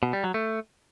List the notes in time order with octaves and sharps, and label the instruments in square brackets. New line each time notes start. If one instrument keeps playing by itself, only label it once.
[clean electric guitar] B2
G3
F#3
A3